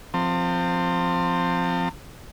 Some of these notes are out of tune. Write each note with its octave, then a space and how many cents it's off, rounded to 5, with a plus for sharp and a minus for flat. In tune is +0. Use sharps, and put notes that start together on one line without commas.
F3 +0 C4 +0 A5 +40